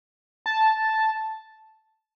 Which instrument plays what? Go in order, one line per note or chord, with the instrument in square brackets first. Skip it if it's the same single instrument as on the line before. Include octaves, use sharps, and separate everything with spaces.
[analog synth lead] A5